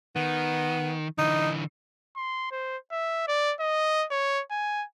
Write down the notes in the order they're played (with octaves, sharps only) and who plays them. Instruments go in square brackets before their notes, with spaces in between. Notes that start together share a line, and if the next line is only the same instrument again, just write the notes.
[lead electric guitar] D#3 [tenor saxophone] B3
[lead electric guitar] D3 E3 [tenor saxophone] D#4
[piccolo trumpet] C6
C5
E5
D5
D#5
C#5
G#5